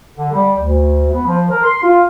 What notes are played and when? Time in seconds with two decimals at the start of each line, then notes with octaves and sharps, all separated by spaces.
0.15 D3
0.32 G3
0.58 D2
1.11 B3
1.25 F3
1.49 A#4
1.63 C6
1.82 F4